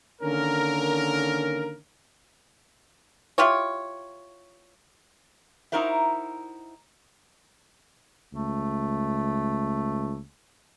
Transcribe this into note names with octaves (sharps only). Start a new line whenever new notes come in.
D3 D#3 A#3 C#4 A#4
E4 F4 G4 C#5
D#4 E4 F#4 A#4 C5 E5
C#2 A3